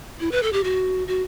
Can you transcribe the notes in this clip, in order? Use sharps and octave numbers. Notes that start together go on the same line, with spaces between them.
E4
B4
A4
G4
F#4
F#4